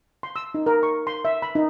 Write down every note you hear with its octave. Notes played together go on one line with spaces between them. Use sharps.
C6
E6
D#4
A#4
C#6
C6
E5
B5
D#4